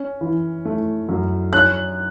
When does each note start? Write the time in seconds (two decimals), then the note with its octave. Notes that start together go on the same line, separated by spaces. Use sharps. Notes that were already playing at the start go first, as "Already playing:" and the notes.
Already playing: C#4
0.21 E3
0.65 A3
1.09 F#2
1.53 C#4 F#6